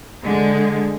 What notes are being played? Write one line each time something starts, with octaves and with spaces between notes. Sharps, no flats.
D3 G#3